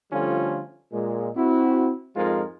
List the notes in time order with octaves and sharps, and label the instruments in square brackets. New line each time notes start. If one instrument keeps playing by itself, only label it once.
[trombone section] D3 F3 G3 A3 C#4 F4
A#2 G#3
C4 E4 F#4
F2 G#2 F3 G#3 F4 A#4